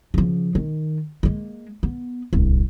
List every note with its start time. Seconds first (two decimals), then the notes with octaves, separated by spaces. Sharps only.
0.14 C#3 F3
0.55 D#3
1.23 G#3 A#3
1.83 B3
2.33 D1 C2